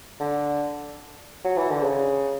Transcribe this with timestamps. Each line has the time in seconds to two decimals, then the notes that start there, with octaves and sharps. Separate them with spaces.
0.20 D3
1.44 F#3
1.57 E3
1.70 D3
1.83 C#3